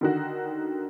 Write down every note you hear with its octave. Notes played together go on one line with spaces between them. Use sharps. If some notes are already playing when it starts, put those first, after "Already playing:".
D3 D#3 F#4